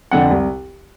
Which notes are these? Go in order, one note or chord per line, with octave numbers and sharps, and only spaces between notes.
F2 D3 F#5
C2